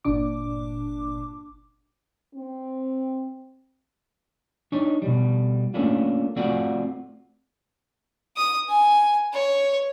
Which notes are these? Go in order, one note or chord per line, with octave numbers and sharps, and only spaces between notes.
G1 A#2 D4 D6
C4
D4 D#4 C#5
B2 G3
A3 A#3 C#4 D4 F4
A3 C4 F4 F#4 D5 F#5
D#6
G#5
C#5